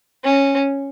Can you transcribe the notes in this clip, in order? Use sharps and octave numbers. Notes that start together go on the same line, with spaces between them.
C#4